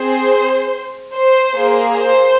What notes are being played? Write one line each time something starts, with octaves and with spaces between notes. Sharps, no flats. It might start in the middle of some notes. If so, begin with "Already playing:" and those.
Already playing: C4 G#4 C5
C5
A#3 G#4
C5